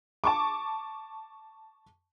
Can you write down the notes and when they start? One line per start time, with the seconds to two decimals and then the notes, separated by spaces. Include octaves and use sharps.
0.24 A5 C#6 D6